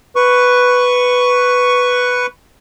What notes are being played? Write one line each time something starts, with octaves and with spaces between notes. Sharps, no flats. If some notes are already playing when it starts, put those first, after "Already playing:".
B4 C#6